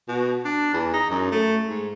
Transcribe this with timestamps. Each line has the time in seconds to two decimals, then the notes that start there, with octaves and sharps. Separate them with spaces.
0.08 B2
0.45 D4
0.73 E2
0.93 D#4
1.10 F#2
1.32 A3
1.68 G#2